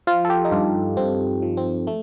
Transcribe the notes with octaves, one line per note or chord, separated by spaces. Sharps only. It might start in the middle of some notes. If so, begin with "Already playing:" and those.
F3 F4
A4
G4
D#4
G2 F4
G2 C4
F3
C4
A3